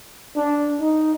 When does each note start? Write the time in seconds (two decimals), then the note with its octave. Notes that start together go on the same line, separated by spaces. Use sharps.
0.36 D4
0.81 D#4